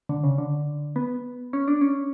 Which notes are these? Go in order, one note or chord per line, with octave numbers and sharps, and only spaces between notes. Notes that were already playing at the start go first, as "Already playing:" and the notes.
D3
C#3
D3
B3
C#4
D4
C#4